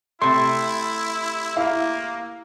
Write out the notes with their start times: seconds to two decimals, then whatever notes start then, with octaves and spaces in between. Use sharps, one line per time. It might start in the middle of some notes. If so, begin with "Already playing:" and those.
0.22 C3 A3 E4 C6
1.56 A#3 E4 F5